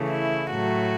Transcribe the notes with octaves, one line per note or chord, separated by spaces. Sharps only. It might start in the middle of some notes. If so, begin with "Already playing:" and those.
Already playing: C#3 E3 A3
E4
A2 F#3 A3 F#4